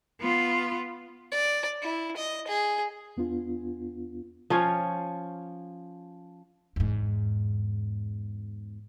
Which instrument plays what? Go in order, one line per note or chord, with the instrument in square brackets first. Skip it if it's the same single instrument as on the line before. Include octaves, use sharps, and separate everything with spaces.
[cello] B3 F4
[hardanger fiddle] D5
E4
D#5
G#4
[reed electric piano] E2 B3 D4 F4
[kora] F3 C#4 F4 C#5
[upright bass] E2 G#2